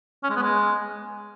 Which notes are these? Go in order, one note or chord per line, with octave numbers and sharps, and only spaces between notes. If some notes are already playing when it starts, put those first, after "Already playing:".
C#4
G#3
B3
G#3